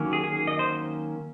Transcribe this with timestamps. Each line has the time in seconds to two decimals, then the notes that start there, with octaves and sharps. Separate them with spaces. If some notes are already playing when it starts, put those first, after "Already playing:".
Already playing: D#3 F#3 A#3 C#4
0.13 G#4
0.24 G#4
0.47 D#5
0.59 C5